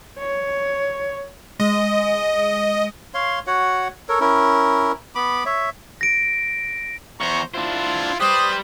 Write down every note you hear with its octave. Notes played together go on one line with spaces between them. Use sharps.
C#5
G#3 D#5
C#5 F5 C6
F#4 C#5 F#5
A4 A#4 C#5
C#4 E4 A#4
B3 B5 D6
C#5 E5
A#6 D7
E2 C5 A#5 C#6
D4 E4 F4 C5
G3 G4 B4 C5 D#6